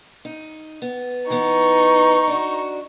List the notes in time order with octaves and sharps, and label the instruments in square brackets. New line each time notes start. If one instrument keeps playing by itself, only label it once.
[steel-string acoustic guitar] D#4
B3
[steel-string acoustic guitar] E3 B3 [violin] D#4 C#6
[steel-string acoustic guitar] D4 F#4